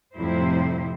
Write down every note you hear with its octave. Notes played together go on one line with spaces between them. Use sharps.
F2 A2 C3 G3 E4 C5